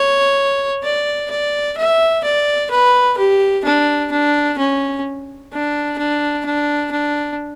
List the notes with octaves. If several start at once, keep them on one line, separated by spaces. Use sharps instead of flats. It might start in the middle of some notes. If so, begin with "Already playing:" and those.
Already playing: C#5
D5
D5
E5
D5
B4
G4
D4
D4
C#4
D4
D4
D4
D4